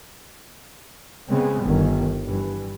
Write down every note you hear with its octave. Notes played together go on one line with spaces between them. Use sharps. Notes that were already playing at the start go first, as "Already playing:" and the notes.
C#3 G#3 B3 C4
G1 D#3
G2 E3